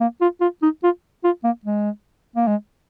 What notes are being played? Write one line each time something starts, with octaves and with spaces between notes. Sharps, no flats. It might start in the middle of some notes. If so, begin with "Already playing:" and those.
A#3
F4
F4
D#4
F4
F4
A#3
G#3
A#3
G#3